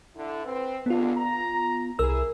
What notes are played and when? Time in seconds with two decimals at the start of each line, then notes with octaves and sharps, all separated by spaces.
0.16 D3 E4
0.45 C4 B4
0.86 C#2 G2 D3 B3 F4
1.17 A#5
1.99 C2 E4 G#4 A#4 E6